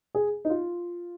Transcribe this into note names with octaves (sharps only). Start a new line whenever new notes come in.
G#4
D#4
F4